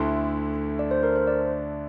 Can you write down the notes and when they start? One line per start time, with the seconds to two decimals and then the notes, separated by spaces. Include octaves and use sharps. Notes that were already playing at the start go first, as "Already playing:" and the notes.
Already playing: D2 D3 A3 E4 C6
0.79 D5
0.91 C5
1.03 A#4
1.16 C5
1.27 D5